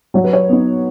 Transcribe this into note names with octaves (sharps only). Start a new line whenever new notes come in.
F#3 C#5
B4
C#5
B3 D#4